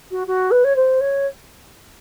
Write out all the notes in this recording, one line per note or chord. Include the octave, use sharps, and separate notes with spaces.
F#4
F#4
B4
C#5
C5
C#5